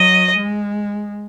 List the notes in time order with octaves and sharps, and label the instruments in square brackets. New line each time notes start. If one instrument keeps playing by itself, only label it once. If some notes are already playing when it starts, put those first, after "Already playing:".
Already playing: [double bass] F#3 [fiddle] D#5
[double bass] G#3